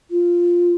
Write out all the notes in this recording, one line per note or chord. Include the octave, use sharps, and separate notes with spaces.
F4